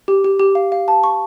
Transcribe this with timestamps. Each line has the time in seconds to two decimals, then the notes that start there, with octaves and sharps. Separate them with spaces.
0.08 G4
0.24 G4
0.39 G4
0.55 F5
0.72 F5
0.88 A5
1.04 C#6